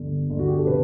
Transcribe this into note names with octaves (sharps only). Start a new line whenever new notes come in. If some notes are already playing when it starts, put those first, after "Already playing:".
Already playing: G1
G1
F#4
G4
A4
C3 B4